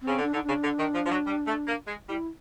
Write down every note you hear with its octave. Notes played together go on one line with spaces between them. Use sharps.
C4
C#3
D3
D4
D3 D#4
D4
C#3
D3
D#3
F3
F3
F#3
G3
A3
A#3
G#3
G3 E4